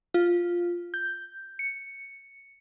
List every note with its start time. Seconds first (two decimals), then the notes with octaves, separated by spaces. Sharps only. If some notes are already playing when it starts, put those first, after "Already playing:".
0.14 F4
0.94 G6
1.59 C#7